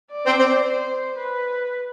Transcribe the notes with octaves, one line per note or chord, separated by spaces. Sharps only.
D5
C4
C4
C5
B4